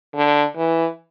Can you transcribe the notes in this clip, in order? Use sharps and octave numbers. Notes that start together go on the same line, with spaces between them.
D3
E3